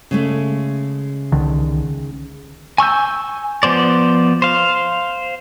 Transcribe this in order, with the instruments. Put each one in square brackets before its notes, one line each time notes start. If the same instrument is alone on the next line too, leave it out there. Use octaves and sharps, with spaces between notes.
[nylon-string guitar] C#3 G#3 A3
[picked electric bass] C2 D3 D#3
[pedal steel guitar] G#5 C#6 E6 G6
F3 B3 C5 D5
C5 F5